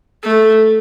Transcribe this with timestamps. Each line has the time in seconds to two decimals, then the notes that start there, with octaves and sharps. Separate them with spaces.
0.23 A3